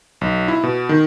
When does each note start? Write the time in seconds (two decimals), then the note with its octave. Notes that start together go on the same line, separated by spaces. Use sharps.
0.21 B1
0.48 E4
0.63 B2
0.89 D#3